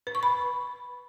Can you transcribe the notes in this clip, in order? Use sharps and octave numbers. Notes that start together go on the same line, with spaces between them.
B4
C#6
B5